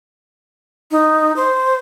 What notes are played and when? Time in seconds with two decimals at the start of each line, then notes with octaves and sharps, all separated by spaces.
0.91 D#4
1.36 C5